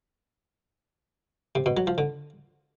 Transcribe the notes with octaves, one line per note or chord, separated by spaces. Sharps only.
C3
B2
F#3
F3
D3